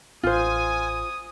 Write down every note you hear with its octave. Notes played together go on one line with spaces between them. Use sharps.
A1 F4 C5 G#5 D#6